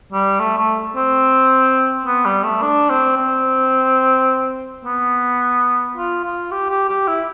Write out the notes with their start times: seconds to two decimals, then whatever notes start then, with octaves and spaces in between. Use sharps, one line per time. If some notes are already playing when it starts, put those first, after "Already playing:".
0.12 G3
0.40 A3
0.58 A3
0.96 C4
2.06 B3
2.25 G3
2.43 A3
2.62 D4
2.90 C4
3.17 C4
4.85 B3
5.97 F4
6.24 F4
6.51 G4
6.70 G4
6.89 G4
7.08 E4